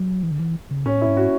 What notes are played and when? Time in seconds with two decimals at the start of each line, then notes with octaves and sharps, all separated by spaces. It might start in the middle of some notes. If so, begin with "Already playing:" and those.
Already playing: F#3
0.23 E3
0.31 D3
0.39 E3
0.71 C#3
0.86 A2 C#4
1.01 E4
1.06 G#2
1.17 F#4